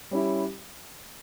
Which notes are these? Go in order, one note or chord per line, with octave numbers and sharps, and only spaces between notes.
G3 C#4 E4